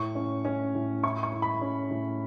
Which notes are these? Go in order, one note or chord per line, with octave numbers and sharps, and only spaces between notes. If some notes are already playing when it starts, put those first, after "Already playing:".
Already playing: A2 C#6
C#4
C#4
A2
E4 C#6
C#6
E4
B5
C#4
A2